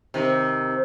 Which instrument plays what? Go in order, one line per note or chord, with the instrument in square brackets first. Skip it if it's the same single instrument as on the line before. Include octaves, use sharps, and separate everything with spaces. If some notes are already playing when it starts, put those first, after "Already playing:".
[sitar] C3 D#3